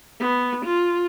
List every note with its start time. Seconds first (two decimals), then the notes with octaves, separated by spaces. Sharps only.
0.20 B3
0.65 F4